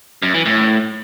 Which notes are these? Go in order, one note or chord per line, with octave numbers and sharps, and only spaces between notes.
F#2
E3
A2